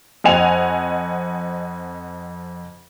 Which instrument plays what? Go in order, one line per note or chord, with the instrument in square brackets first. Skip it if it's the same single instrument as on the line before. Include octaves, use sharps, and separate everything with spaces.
[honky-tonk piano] F2 C4 D#5 F#5 G#5 F7